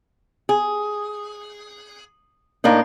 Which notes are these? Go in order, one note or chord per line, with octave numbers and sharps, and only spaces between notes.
G#4
A2 A#3 D4 D#4